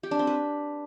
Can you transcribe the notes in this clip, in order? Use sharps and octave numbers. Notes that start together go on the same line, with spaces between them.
G4
D4
C4
B4